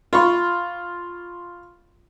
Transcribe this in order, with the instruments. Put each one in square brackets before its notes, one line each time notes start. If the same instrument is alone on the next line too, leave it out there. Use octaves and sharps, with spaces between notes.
[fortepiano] F4 B5 C#6